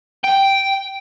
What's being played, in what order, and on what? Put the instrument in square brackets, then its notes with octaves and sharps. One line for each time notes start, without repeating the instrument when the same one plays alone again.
[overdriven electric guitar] G5